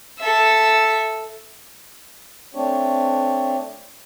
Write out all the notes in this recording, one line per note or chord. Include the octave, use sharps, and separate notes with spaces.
A4 E5
A3 C4 D4 C#5